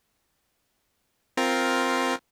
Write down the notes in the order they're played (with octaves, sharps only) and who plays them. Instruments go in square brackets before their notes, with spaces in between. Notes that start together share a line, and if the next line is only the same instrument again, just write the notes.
[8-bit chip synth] C4 F4 A#4